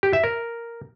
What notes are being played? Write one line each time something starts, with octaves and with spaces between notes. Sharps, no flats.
G4
E5
A#4